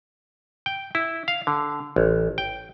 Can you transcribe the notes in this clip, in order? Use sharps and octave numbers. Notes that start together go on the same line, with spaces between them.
G5
E4
F5
D3
A1
G5